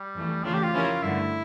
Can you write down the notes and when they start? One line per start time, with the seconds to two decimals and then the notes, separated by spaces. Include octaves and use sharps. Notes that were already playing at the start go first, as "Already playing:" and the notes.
Already playing: G3
0.15 F2 E3 A3
0.44 C#3 E3 A3 D4 F4
0.54 G4
0.63 F4
0.74 F3 C#4 E4 G4 A#4
1.02 G2 D3 A3 E4